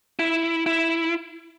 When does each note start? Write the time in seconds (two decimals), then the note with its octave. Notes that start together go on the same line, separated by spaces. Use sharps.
0.19 E4
0.66 E4